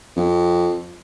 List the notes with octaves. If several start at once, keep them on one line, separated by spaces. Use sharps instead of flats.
F2